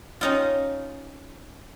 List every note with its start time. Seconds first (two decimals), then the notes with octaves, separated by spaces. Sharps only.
0.21 C#4 D#4 F4